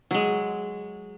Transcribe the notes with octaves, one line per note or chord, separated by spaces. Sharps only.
F#3 G#3